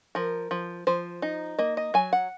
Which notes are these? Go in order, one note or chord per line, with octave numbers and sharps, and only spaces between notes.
F3 A#4
F3
F3 C5
D#4
A#3 D#5
D#5
F#3 G#5
F#5